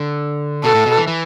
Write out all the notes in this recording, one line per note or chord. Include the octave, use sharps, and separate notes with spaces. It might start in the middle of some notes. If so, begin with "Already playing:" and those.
Already playing: D3
B2 A4
A2
B2
E3
E3